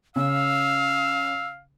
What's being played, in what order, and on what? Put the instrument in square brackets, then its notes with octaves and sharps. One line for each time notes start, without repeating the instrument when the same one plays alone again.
[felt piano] C#3 [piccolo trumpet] F5 [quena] E6